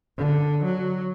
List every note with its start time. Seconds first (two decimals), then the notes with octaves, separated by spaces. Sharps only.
0.18 D3
0.64 F#3